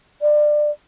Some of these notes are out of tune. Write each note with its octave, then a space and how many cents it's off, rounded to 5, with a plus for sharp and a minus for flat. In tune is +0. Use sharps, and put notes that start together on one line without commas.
D5 +25